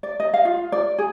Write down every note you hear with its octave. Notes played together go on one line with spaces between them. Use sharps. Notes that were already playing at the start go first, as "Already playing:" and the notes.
D5
D#5
F5
F4
D5
G#4